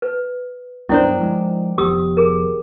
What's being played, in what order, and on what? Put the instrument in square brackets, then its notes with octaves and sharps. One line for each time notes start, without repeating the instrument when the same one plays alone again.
[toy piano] B4
[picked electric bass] G2 F#3 B3 [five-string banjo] D#3 D4 C5 [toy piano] E4
[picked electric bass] F3 F#3 G#3
[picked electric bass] F1 F3 B3 [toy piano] G4 D#6 E6
[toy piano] G#4 A#4